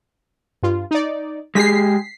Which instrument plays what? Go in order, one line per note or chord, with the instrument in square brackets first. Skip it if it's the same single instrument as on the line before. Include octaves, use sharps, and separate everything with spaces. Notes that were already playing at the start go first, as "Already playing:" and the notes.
[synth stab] G2 F4
D#4 D5
[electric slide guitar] G#3 G4 G#4 [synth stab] B6 C7